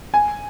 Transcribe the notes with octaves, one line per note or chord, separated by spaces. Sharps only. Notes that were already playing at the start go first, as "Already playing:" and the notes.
G#5